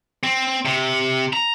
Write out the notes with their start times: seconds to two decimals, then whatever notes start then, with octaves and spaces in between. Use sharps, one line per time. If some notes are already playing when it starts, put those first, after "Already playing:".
0.23 C4
0.65 C3
1.33 A#5